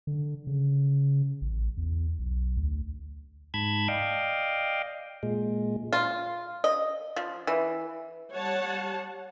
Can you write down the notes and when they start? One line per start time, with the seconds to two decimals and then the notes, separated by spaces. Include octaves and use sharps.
0.07 D3
0.47 C#3
1.42 A1
1.77 E2
2.19 B1
2.57 D2
3.54 G#2 A5 B5 G#6
3.88 D5 D#5 F5 G5
5.23 A#2 G#3
5.93 F4
6.64 D#5
7.16 F3
7.47 E3
8.31 G3 C#5 F#5 A5